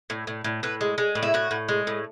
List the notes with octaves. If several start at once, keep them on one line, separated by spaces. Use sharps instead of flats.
A2
A2
A2
A2 B4
G#3
G#3
A2
E4
A2 F#4
A2
G#3
A2